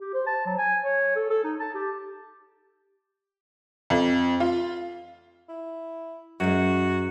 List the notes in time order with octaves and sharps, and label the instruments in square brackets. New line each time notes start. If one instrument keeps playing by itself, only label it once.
[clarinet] G4
C5
A5
F#3
G#5
C#5
A4
A4
D#4
A5
G4
[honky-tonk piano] F2
F4
[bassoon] E4
[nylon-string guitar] F#2 G#3 [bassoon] F#4